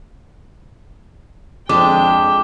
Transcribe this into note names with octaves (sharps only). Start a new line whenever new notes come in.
F2 G#3 D4 G5 D6